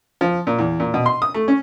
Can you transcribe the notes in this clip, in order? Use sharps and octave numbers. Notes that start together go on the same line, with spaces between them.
F3
A#2
E2
A#2
B2
C6
D#6
A3
C#4